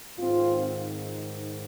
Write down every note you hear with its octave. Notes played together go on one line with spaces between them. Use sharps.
G#2 D#3 C4 F4